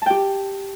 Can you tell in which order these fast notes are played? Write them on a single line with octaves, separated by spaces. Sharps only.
A5 G5 G4